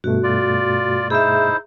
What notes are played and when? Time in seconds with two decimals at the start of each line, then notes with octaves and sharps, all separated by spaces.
0.04 G2 B2 A3 F#4
0.23 F4 D5
1.10 D#4 E4 G#4 C5 E5